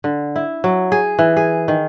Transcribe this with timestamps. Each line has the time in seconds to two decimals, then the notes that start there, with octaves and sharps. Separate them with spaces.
0.04 D3
0.36 E4
0.64 F#3
0.92 G#4
1.19 E3
1.37 G#4
1.68 D#3